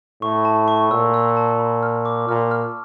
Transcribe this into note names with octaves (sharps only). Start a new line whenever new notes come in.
A2 C#6
A5
C#6
A#2 E6
E6
A5
B5
F6
D6
A#2 F6
F6